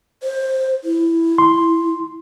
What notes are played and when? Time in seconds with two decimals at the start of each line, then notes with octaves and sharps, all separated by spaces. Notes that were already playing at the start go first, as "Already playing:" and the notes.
0.23 C5
0.84 E4
1.38 C6